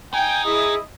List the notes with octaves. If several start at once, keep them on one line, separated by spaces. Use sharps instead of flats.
D#4 G5 G#5
E4 G#4 D#5